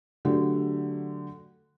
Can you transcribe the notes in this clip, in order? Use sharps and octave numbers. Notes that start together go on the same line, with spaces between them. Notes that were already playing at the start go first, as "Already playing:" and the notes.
D3 F#3 A3 G4